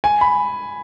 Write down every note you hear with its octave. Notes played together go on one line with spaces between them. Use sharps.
G#5
B5